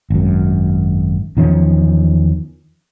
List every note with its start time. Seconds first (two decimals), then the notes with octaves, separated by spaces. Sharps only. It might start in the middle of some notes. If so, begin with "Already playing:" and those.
0.10 G#1 F#2
1.37 E2 D#3 F3 C#4